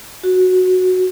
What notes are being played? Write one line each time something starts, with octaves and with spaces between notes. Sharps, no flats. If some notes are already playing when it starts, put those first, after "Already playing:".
F#4